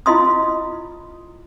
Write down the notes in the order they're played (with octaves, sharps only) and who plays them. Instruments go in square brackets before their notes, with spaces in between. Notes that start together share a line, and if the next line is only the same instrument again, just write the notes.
[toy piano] E4 F4 D#5 C6 D#6